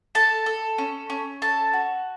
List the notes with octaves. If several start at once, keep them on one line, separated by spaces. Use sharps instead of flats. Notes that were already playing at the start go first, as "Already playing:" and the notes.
A4 A5
A4
C#4
C#4
A4 A5
F#4